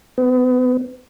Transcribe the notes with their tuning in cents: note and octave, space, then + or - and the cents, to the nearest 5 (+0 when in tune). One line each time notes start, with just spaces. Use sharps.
B3 +35